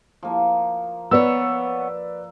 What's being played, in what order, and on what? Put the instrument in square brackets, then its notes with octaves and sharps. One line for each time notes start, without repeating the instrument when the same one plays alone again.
[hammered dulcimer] F3 A#3
[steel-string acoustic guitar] B3 C#5 [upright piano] B4 D5 E6